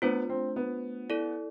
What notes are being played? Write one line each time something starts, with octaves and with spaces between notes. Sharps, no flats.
A3 B3 D4 F4 C5
C4
B3
E4 A4 D5